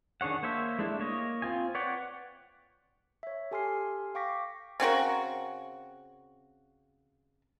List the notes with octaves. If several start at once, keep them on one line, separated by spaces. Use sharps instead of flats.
D#3 D4 G#4 C#5 F#5
A#3 C5 C#5 E5
G#3 A3 D4 E4
A#3 C#5 D#5
C4 F4 G#5
B4 C#5 D5 F#5 G5
C#5 E5
G4 A4 G#5 C6 F6 C7
F5 G5 C#6 D6 A#6 B6
C#3 C4 F#4 A#4